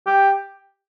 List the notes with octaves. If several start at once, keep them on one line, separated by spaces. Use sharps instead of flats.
G4